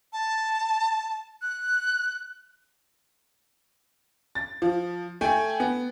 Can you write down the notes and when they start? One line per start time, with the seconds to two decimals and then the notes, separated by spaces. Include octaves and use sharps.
0.13 A5
1.42 F#6
4.35 A6
4.62 F3
5.21 A3 G5 G#5
5.60 B3